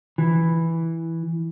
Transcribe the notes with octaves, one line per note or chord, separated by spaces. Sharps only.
E3